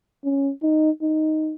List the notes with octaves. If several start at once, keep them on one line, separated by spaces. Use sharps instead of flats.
C#4
D#4
D#4